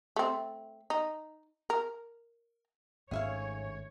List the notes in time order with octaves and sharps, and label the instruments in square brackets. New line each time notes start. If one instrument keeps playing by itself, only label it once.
[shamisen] A3 C4
D#4
A#4
[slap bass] G#1 A3 C#4 [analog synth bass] G#2 [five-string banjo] G#4 E5 F5 [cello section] C#5